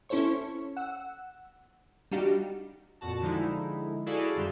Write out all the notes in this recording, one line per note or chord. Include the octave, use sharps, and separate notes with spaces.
C#4 E4 A4 C5 C#5 C#6
F#5 E6
G3 D4 D#4 F#4 G4 F5
F2 A#2 F#4 A5
D3 F3 G#3 D#4 E4
E4 F#4 G#4 A4 D5 F5
F#2 D3 G3 C6 E7